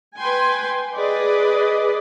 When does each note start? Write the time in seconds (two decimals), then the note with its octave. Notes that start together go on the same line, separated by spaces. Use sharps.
0.18 B4 G5 G#5 C6
0.95 G#4 B4 D5 D#5